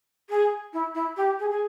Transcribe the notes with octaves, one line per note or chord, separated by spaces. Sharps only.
G#4
E4
E4
G4
G#4
G#4